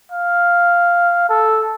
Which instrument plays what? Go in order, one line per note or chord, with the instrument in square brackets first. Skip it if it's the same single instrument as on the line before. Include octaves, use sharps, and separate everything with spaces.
[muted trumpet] F5
A4